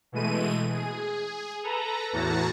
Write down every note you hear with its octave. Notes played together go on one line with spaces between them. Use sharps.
B2 E3 G#3 A3 D#7
G#4
A4 B4 A#5
E2 A2 E3 F#4 A5 A#5